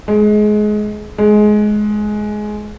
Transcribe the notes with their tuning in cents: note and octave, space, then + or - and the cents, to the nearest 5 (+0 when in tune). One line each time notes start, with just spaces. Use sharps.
G#3 +25
G#3 +20